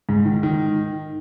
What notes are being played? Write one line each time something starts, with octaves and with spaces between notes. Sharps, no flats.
G#2
D#3
D#3